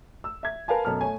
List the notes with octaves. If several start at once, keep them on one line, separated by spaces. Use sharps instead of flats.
E6
E5 G#6
A#4 B4 F5 G#5 A5
F#2 B2 A4 F6
A3 C#5 G#5